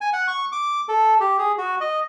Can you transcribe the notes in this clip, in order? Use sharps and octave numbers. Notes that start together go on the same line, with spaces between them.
G#5
F#5
C#6
D6
A4
G4
G#4
F#4
D#5